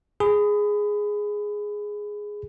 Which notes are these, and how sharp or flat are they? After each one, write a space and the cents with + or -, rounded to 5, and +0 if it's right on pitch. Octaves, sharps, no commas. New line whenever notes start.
G#4 +0 B5 +25